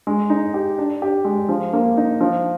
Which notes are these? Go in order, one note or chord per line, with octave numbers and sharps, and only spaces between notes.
G#3
D#4
G4
D4
G4
G#3
F3
A#3
D#4
F3